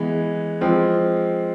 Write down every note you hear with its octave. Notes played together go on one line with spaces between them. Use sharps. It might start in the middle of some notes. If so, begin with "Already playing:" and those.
Already playing: E3 G#3 B3
F3 G#3 C4